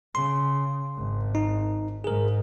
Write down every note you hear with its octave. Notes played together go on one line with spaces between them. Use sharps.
C#3 C6
G#1
D#4
G#2 G#4 A#4